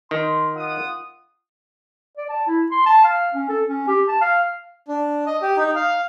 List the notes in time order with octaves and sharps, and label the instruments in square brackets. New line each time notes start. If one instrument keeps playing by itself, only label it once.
[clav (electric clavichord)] D#3 [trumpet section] C6
[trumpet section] F4 F#5 D#6
[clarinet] D5
A5
E4
C6
A5
F5
C#4
A4
C#4
G4
A5
F5
[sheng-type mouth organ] D4
D#5
G4
D#4
F5